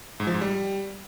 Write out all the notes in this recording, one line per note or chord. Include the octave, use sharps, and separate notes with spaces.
G#2
F3
G#2
G3